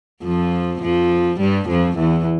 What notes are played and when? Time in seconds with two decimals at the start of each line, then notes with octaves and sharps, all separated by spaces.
0.23 F2 F3
0.82 F2 F3
1.39 G2 G3
1.68 F2 F3
1.98 E2 E3